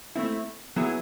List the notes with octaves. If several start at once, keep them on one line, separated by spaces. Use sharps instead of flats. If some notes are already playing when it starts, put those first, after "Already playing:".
A3 C4 E4
F#3 B3 E4 G#4